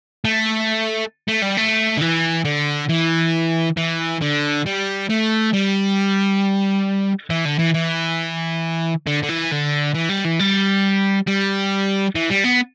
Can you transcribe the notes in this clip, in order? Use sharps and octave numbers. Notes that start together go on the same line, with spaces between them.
A3
A3
G3
A3
D3
E3
D3
E3
E3
D3
G3
A3
G3
E3
D3
E3
E3
D3
D3
E3
D3
E3
G3
E3
G3
G3
E3
G3
B3